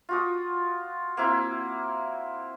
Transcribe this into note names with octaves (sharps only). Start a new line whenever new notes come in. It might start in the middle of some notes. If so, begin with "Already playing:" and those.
F4 F#4 D#6
A#3 C4 E4